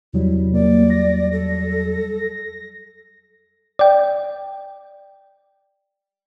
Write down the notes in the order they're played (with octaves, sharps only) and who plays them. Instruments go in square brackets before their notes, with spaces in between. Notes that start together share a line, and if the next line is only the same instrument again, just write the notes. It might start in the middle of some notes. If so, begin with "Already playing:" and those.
[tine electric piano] E2 F#3 G3 [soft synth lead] C3 [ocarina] E4
[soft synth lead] A#3 [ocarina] D5
[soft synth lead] A#6
[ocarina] A4
[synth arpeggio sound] D5 G5